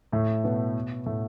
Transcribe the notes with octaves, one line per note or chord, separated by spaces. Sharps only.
A2 A3
B2 B3
A2 A3